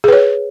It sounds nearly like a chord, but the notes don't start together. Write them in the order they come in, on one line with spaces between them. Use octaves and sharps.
G#4 B4 C#5